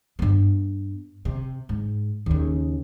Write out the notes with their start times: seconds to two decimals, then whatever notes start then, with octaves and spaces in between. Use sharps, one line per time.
0.19 G2 B3
1.25 C3
1.69 G#2
2.26 D#2 C#3